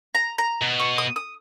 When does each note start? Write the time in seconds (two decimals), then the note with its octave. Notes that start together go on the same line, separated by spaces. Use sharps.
0.15 A#5
0.38 A#5
0.62 B2
0.80 C#6
0.98 D#6
1.16 D#6